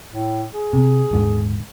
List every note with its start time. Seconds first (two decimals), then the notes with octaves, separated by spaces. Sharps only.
0.13 A2
0.53 G#4
0.73 C3
1.11 D#1 G#2 D3